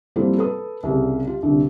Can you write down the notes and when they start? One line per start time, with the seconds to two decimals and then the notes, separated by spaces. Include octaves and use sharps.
0.16 F3 G3 A#3 C4 E4 A4
0.38 A4 B4 D#6
0.83 C2 C#3 G3
1.25 F4 G4
1.43 C2 G2 D3